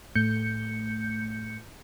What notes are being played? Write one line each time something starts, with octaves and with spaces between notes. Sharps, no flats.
A2 A3 G6 C#7